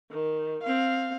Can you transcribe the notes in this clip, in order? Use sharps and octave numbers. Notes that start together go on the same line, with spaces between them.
D#3
C4 F5